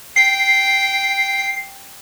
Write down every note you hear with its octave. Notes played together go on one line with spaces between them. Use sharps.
G5 C7